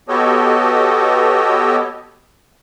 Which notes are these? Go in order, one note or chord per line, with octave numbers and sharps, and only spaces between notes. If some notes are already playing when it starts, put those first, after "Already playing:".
B3 F#4 G4 A4 C#5 D#5